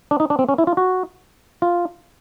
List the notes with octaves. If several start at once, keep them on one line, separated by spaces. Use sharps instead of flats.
D4
D#4
D4
C4
C#4
E4
F4
F#4
F4